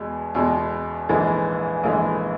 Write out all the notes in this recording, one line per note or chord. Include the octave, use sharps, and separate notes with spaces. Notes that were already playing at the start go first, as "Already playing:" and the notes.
Already playing: E2 B2 G#3
E2 B2 G#3
A#1 G#2 E3 G#3
A#1 G#2 E3 G#3